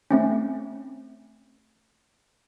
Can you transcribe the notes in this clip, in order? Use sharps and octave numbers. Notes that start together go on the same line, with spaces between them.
A3 C4 C#4